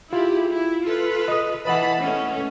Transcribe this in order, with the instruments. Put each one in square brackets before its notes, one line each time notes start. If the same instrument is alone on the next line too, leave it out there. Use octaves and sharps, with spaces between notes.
[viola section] E4 G4 G#4 [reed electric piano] F4
[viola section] E4
F4 A4 B4
[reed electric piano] D#5 D#6
[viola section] E3 A5 B5 [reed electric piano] B4 D#5 F#5
[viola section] A3 C#4